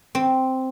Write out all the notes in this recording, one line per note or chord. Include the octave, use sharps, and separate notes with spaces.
C4